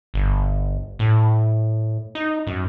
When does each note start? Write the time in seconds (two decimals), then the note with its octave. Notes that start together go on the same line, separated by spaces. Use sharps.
0.14 G1
0.99 A2
2.15 D#4
2.47 F#2